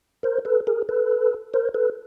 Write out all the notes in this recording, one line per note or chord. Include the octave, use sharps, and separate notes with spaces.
A#4 C5
A4 B4
G#4 A#4
A4 B4
A#4 C5
A4 B4